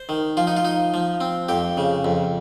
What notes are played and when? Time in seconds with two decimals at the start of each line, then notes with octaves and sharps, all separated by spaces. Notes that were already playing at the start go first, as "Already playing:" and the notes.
Already playing: C5
0.09 D#3
0.37 F3 F4
0.47 D#4
0.57 F4
0.65 D#4
0.94 F3
1.21 C4
1.49 F2 G4
1.77 C#3
2.05 F2